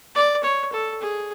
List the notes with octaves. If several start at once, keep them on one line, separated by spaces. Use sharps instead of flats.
D5
C#5
A4
G#4